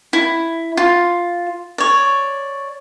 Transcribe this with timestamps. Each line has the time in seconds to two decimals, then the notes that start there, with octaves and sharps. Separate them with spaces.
0.13 E4
0.77 F4
1.78 C#5 D5